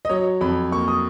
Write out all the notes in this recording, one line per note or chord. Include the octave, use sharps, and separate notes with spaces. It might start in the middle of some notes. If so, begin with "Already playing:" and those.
D#5
F#3 C#5
F2 B5
A#3 C#6
D#6